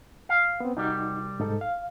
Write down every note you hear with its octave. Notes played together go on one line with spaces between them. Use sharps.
F5
B3 C4
C2 G3 D#4 F#4
G#2 D#4 A4
F5